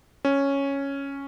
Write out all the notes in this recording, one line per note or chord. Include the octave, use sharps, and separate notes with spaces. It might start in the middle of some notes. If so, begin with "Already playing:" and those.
C#4